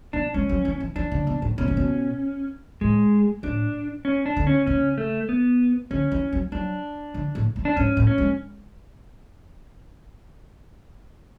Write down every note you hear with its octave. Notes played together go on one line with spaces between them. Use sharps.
B2 D4
G#3 C#4
F#3
E3
E3
E3 D4
C#3
B2
A2
B2 C#4
C#3
B2
A2 G#3
A2 D4
C#4
D4
D3
C#4
C#3 C#4
A3
B3
D3 C#4
E3
F#3
F#3 D4
D3
A2
A2
D4
G#2 C#4
A2
C#4
G#3